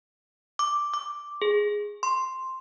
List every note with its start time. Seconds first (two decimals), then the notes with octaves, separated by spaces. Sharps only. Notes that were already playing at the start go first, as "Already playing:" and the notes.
0.59 D6
0.94 D6
1.42 G#4
2.03 C6